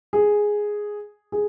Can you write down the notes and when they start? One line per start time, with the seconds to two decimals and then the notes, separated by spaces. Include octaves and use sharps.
0.13 G#4
1.32 G#4